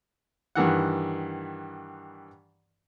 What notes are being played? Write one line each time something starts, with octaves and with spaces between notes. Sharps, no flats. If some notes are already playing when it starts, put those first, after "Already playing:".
G2 D#3 E3 F#5